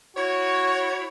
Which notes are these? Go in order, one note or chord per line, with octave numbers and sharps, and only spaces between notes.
E4 F#4 C#5